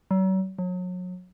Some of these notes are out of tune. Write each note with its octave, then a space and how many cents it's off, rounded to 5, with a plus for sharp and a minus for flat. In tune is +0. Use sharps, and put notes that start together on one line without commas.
F#3 +40
F#3 -35